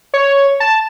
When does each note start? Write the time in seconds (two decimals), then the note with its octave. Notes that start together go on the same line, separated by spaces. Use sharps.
0.14 C#5
0.60 A5